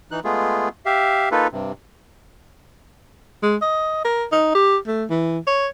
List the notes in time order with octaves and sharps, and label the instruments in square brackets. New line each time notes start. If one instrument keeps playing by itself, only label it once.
[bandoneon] E3 D#4 F#6
G#3 A3 B3 F4 G#4
G4 E5 F5
A#3 D#4 F4 A4 B4
G2 C3
[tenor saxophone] G#3
D#5
A#4
D#4
G4
A3
E3
C#5